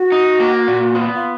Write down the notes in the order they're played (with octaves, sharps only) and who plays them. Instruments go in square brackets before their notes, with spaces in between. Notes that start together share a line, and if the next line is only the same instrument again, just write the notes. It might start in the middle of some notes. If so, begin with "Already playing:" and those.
Already playing: [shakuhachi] F#4
[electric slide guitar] D#4
A#3
A#2
[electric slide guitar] B3 [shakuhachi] F4
[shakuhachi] F4